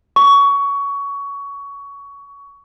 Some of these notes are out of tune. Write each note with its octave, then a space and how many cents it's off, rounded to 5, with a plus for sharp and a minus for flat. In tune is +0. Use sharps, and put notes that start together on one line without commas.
C#6 +20